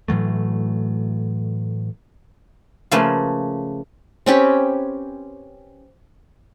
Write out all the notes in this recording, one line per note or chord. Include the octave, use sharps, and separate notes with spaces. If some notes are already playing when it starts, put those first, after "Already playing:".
A2 E3 F#3 A3
C#3 F3 A3 A#3 B4 G#5
C4 C#4 G4 B4